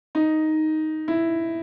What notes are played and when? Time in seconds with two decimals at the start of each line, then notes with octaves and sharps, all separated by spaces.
0.15 D#4
1.08 E4